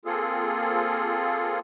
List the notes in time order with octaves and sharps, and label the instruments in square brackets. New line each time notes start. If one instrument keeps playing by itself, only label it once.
[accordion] A#3 C4 F4 G#4 A4